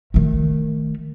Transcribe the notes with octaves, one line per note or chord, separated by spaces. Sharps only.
D#3 A3